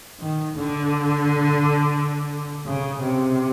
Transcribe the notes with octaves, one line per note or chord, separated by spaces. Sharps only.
D#3
D3
C#3
C3